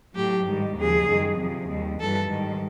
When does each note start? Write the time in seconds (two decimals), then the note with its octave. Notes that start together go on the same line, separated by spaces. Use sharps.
0.15 A2 F#3 G4
0.46 G#2 D#3 G3
0.76 D#2 C#3 F3 G#4
1.07 F#2 D#3 G3
1.38 F2 C3 F3
1.69 D#2 D#3 G3
1.99 G2 E3 G3 A4
2.30 G#2 D#3 G3